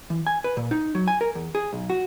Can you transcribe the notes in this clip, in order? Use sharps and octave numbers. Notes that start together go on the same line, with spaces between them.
E3
G#5
B4
A#2
D#4
F#3
G#5
A#4
E2
G#4
B1
F#4